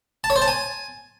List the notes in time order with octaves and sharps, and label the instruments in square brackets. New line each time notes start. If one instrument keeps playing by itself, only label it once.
[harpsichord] A5
C#5
C5
A5
G#5